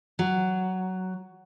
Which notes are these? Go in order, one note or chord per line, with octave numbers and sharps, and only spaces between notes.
F#3